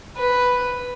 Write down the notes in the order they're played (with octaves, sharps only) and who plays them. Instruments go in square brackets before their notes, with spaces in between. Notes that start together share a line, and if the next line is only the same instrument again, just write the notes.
[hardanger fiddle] B4